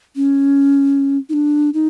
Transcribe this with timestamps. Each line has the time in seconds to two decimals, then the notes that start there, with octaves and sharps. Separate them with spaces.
0.16 C#4
1.29 D#4
1.33 D4
1.74 D#4